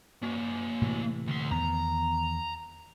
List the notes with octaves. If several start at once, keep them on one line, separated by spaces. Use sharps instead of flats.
A#3 F#4
A2 C3 E3
D2 C6
E2 D#3 B3 A#5